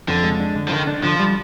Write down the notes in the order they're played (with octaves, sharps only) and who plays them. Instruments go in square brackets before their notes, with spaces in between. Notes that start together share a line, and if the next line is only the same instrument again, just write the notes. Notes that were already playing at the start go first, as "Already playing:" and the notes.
[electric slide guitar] F2 [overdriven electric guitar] D3
[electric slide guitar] G#3
D4
D3
[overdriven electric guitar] F3
[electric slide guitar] D3 [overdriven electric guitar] D#3
[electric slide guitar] D4
[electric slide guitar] D3 [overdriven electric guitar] F3
[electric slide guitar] G3